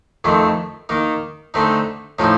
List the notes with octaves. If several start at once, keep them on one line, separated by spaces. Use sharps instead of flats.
F2 D#3 A3 C4
D#3 A#3 D#4
D3 A3 C4 D#4
A2 F3 C4 D#4